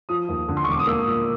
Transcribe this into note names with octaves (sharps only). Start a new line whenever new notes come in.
F3 D#6
D#2
D3
C6
C#6
E1 D6
D#6
A#3 E6
A#2